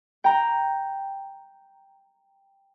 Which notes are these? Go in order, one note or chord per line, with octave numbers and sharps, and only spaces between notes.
G5 A#5